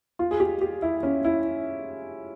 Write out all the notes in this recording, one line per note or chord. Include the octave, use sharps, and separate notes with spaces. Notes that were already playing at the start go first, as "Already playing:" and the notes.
F4
G#4
G4
G4
E4
C#4
E4